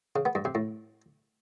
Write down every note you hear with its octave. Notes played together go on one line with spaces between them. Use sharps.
C#3
B3
G2
C3
A2